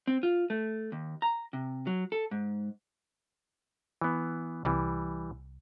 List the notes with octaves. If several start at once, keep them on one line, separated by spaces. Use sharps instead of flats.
C4
F4
A3
D#2
A#5
C3
F#3
A4
G#2
E3 B3
C2 E3 G3